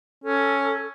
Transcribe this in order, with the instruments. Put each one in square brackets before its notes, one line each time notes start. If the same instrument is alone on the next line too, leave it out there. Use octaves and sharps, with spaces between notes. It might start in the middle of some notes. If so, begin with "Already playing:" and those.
[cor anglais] C#4 [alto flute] A4